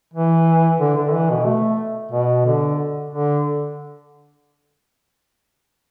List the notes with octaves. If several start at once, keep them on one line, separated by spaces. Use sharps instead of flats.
E3
D3
D3
E3
B2
A3
B2
D3
D3